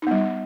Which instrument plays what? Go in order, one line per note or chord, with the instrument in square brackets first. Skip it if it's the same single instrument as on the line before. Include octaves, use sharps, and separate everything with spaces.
[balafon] D#4
B3
G3